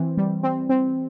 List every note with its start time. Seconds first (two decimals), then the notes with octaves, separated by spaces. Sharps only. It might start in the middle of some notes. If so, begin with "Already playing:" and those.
Already playing: E3 C4
0.17 G3
0.43 C4
0.69 C4